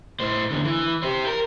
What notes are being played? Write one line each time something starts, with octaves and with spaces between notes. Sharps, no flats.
A2 C5
E2 D3
E3
G4 C5
A#4